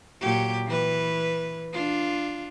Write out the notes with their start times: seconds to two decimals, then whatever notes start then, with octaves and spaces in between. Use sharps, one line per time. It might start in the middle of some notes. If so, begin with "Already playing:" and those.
0.21 A#2 F#3 G4
0.66 E3 B4
1.73 D4 F4